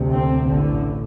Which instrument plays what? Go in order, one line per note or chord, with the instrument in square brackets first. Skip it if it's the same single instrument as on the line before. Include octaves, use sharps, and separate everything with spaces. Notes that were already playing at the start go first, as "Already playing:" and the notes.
Already playing: [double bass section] D2 C3
C4
A1 A2 D3